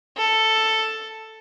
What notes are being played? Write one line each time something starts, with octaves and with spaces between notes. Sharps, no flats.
A4